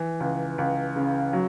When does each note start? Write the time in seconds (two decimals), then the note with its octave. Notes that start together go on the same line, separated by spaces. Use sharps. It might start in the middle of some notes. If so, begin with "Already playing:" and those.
Already playing: E3
0.20 C#2
0.58 C#2
0.96 C#3
1.33 F#3